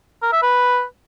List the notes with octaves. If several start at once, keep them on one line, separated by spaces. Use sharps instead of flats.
A#4
E5
B4